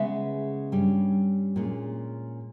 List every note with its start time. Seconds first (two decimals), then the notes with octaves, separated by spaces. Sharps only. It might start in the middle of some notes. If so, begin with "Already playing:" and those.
Already playing: C#3 G#3 B3 E5
0.72 G2 G3 C#4
1.56 A#2 G#3 C#4